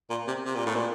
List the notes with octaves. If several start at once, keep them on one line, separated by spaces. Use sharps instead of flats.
A#2
C3
C3
A#2
A2
A#2